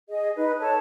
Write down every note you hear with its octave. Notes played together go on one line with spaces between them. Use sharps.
G#4 D#5
D#4 B4
A4 C#5 A5